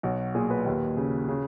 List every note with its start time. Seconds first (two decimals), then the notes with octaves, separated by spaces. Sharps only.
0.03 B1 F#4
0.35 A#2 G#4
0.50 B4
0.66 D#2
0.97 C#3
1.28 C#3